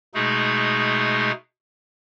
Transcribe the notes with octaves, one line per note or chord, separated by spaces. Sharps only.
B2 G#3 A3 D#4 G#4